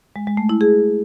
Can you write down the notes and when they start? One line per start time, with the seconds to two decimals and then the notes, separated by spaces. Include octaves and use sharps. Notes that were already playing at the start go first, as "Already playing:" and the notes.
0.16 G#3
0.27 G#3
0.37 A3
0.49 E4
0.61 G#4